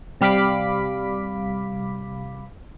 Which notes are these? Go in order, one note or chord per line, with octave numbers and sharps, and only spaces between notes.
C3 G3 F5 B5 D6 B6